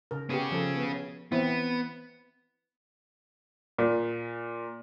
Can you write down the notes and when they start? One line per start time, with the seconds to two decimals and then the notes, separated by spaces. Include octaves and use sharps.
0.11 C#3 A#4
0.30 B3 C#4 G4 G#4
0.52 F3 A4
0.76 B3
1.32 E3 B3 C4 E4
3.79 A#2